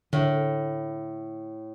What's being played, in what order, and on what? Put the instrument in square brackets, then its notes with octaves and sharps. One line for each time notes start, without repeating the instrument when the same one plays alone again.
[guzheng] A2 [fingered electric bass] D3